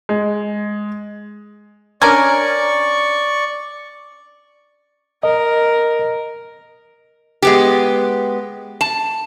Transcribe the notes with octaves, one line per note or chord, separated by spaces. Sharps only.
G#3
C#4 D4 A#4 D5 G#5 C#6
A#4 D#5
G#3 B3 G4
A5